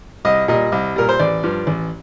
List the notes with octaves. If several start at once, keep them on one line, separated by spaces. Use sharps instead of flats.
C2 D#5
A#2 G3 D#5
C2
A#2 G3 A#4
C5
A1 D5
G2 F3
A1